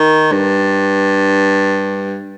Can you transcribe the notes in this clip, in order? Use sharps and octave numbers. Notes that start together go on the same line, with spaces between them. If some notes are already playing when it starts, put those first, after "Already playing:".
Already playing: D#3
G2